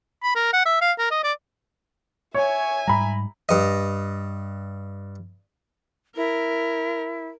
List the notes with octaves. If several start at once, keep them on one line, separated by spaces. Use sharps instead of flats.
B5
A#4
F#5
E5
F5
A#4
D#5
D5
C#5 E5 G#5
G#2 G3 A#5 B5
G2 D#5
E4 A#4